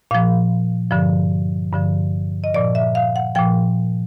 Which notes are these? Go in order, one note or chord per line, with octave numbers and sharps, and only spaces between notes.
A#2 F3 F5
G2 D3 F3
G2 D3 F3
D#5
A#2 F3 D5
E5
F5
F#5
A#2 F3 G5